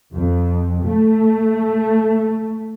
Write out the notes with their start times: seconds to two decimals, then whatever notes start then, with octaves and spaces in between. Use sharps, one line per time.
0.12 F2
0.85 A3